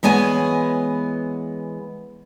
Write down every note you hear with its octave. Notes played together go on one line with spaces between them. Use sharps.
E3 G#3 B3 C#5 G#5